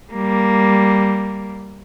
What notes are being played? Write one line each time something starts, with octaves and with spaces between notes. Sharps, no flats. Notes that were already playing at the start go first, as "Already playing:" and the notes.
G3 A#3